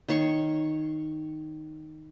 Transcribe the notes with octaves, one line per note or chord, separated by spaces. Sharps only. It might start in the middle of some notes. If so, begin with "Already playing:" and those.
D#3 C#5 C6 C#6